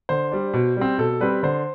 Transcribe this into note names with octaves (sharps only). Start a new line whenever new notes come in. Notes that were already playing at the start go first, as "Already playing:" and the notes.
D3 C5
G3 D4
B2
G3 C4
B2 A4
G3 C4 B4
D3 C5